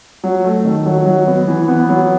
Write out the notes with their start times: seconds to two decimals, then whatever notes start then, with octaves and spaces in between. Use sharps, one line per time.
0.24 F#3
0.44 A3
0.65 D#3
0.86 F#3
1.06 F#3
1.27 B3
1.48 E3
1.68 B3
1.89 F#3